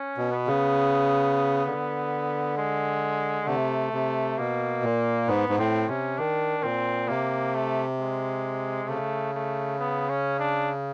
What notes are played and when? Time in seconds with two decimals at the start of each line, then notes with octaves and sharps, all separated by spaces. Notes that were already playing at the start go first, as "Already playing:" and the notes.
Already playing: C#4
0.17 B2
0.31 B3
0.47 C#3
1.66 D3
2.57 G#3
3.47 C3 A3
3.93 C3
4.38 B2 A#3
4.83 A#2
5.28 G#2 B3
5.49 G#2
5.58 A2 C4
5.88 C3 C#4
6.18 D#3 D4
6.63 A#2 C4
7.08 C3 A#3
7.54 A3
7.99 G#3
8.88 C#3 A3
9.34 A3
9.79 B3
10.09 C#4
10.39 D4